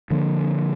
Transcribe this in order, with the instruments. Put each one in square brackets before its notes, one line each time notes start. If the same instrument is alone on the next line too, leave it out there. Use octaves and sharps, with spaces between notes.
[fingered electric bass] D3 F3 A#3 D4